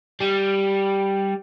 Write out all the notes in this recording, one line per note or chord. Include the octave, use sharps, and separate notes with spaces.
G3